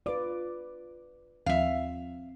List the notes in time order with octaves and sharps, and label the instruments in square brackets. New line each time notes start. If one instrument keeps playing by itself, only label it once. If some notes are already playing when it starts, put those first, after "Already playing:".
[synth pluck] F4 D6 [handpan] B4 D5
[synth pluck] D#2 F3 [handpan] C4 [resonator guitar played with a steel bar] E5 F5